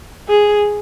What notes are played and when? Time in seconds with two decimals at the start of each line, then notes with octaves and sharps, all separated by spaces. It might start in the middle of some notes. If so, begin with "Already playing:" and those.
0.29 G#4